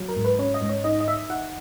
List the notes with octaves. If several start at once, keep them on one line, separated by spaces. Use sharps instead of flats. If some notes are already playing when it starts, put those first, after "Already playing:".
Already playing: F#3
A#4
G#2
B4
C#4 C#5
D#5
G#2
C#5
D#4 D#5
D#5
D#4 E5
D#4 F#5